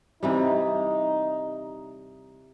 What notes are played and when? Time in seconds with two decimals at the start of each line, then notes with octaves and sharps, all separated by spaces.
0.23 C3 E3 G3 D#4